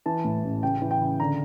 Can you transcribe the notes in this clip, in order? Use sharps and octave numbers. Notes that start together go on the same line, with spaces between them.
E3 A5
A2
A1
C#3 G5
E3
G5
C#3
D3 A#5